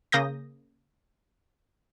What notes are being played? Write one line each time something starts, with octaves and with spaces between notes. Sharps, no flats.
C#3 A#3 D#6 G6 A#6